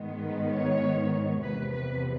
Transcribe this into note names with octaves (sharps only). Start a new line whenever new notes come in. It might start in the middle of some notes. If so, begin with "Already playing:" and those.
Already playing: G#2 D#3 G#3 B3
C#5
E2 C3 F3 A#3 B4
B4